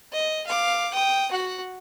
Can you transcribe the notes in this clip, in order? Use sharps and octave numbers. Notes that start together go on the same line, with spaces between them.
D#5
F5 D6
G5 D#6
F#4 F#5